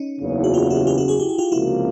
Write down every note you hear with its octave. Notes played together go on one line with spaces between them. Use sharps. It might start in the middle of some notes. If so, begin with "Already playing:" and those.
Already playing: C#4 D#4
F#1 E2 C#3
F#4
F4 G4
E4 F#4
F4 G4
E4 F#4
F#4 G#4
G4
G#4
F4 G4
C#2 C3 F3 A#3 E4 F#4